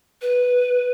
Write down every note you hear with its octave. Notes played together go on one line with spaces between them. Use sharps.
B4